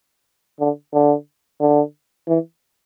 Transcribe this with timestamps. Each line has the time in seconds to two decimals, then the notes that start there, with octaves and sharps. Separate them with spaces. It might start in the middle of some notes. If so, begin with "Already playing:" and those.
0.60 D3
0.93 D3
1.61 D3
2.28 E3